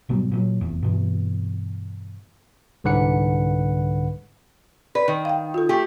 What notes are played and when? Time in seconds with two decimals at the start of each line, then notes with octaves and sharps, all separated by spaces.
0.09 G#1 B2 F#3 G3
0.31 A#2 E3 F#3
0.61 F1 E2
0.83 G2 B2 E3
2.84 C2 G#2 D3 B4 F#5 C#7
4.95 B4 D5 B5
5.08 D#3
5.25 F5 G5
5.54 F4 A4
5.69 A3 G4